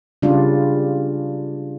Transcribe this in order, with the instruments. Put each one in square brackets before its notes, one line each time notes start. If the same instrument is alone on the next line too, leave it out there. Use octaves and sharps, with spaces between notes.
[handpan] C#3 G3 D4 F4